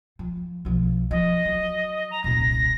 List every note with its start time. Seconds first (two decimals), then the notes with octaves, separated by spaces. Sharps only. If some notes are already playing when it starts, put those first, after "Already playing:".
0.19 F3
0.65 B1 F3
1.11 F3 D#5
1.45 F#3
2.11 A#5
2.24 D#1 C2 A#6